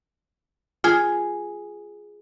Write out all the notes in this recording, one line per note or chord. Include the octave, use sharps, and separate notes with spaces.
F4 G#4